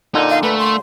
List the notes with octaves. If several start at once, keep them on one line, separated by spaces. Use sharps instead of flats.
A#2 D3 D#4
F5
A3 B4
C6